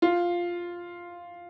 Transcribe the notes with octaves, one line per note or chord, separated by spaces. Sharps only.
F4